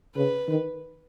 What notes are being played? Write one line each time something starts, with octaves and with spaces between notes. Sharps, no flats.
C#3 B4
D#3